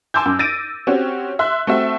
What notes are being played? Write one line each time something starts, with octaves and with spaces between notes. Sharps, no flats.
G#5 A5 C6 D6 E6 G6
F#2
E6 A6 A#6 D7 D#7
C4 C#4 F#4 G4
E5 C6 F#6
A3 C4 F#4 E5